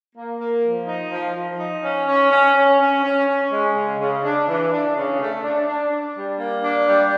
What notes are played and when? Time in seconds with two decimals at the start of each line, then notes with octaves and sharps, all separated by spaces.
0.15 A#3
0.39 A#3
0.63 F3
0.87 D#4
1.11 F3
1.35 F3
1.59 D#4
1.83 C#4
2.08 C#4
2.31 C#4
2.56 C#4
2.80 C#4
3.03 C#4
3.28 C#4
3.51 G#3
3.75 C#3
3.99 C#3
4.24 D4
4.48 E3
4.72 D4
4.96 C#3
5.20 A3
5.43 D4
5.68 D4
5.92 D4
6.15 G3
6.39 A#3
6.63 D4
6.88 G3